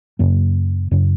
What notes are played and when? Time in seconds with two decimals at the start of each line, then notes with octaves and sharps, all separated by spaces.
0.19 F#2 C#3 A#3
0.91 F#2 C#3